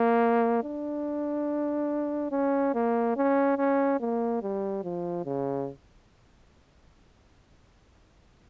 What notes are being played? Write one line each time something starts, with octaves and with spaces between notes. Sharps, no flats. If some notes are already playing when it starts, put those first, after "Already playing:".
Already playing: A#3
D4
C#4
A#3
C#4
C#4
A#3
G3
F3
C#3